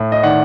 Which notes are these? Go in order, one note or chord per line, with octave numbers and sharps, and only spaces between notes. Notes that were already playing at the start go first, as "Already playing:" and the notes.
Already playing: A2
D#5
D#3 D5 F#5